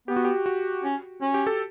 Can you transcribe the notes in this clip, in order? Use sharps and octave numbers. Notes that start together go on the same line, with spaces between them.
B3 G4
F#4
G4
F#4
C#4
C#4
G4
A4